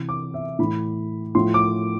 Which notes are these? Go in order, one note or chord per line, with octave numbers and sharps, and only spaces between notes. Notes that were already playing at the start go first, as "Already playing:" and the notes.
Already playing: C3 E3
D6
E5
A2 E3 B5
A2 F3 C6
D6